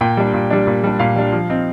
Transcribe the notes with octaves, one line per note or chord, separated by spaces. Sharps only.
A#2 G5
G3 D4
A#2
G3 D4
A#2
G3 D4
A#2 F5
G3 D4
F3
C4 D#4